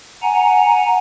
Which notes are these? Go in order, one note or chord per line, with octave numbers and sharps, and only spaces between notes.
F#5 G#5 A#5